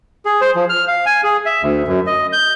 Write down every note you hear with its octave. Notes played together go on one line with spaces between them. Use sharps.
G#4
C5
F3
F6
F5
G#5
G#4
E5
D2
F#2
D#5
G6